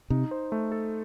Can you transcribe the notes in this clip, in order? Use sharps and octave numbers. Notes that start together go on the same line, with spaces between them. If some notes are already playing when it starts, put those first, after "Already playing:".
C3 D#4
C5
A3
A4